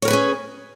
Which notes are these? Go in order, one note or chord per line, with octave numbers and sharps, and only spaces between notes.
C#4 G#4 A#4 B4 C#5